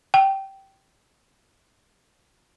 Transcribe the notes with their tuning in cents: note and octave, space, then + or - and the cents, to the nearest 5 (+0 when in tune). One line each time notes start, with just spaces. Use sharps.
G5 -15